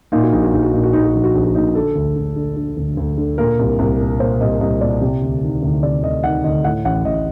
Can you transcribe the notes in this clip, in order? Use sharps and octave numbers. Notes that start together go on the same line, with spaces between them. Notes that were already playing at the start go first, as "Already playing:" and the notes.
A#2 D#4
F#4
A#1 D#4
F#4
A#1 D#4
F#4
A#2 D#4
F#4
A#2 D#4
F#4
A#1 D#4
F#4
A#1 D#4
F#4
A#2 D#4
D3 A4
D2
D2
D3
D3
D2
D2
D3
A#2 A#4
C2
C2
A#2
A#2 C5
C2 D#5
C2 D#5
A#2 D5
C3
D2
D#3
D2
C3 D5
D2 D#5
D#3 F#5
D2 D#5
A2 F#5
A1 F#5
A1 D#5